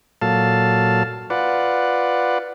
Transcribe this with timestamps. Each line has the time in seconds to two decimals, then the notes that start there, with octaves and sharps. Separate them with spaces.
0.22 A#2 F#3 A4 F5 A5
1.30 F4 B4 D5 F#5